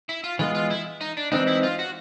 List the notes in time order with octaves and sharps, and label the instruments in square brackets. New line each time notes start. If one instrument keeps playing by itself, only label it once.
[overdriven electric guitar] E4
F4
[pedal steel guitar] E3 G#3 B3 [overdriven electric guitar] F4
[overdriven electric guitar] F4
E4
D#4
D4
[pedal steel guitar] E3 G#3 C4 D#4 [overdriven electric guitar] D4
[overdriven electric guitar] E4
F4
F#4